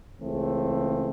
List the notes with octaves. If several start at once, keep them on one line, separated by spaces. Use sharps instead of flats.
C#2 C#3 E3 A3 C4